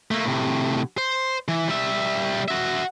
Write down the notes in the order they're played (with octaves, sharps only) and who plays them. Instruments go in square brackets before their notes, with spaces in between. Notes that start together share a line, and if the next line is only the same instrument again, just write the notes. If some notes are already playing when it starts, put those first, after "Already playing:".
[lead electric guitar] A3 A#3
A2 C3
C5
E3
G3 E5
F#4 E5